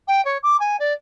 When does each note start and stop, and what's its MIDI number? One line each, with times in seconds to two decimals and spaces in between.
0.07 0.23 79
0.25 0.37 73
0.43 0.56 86
0.59 0.76 80
0.79 0.93 74